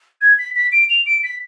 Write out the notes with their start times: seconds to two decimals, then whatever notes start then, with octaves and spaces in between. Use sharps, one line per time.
0.21 G#6
0.39 B6
0.55 B6
0.72 D7
0.89 F7
1.06 D7
1.24 B6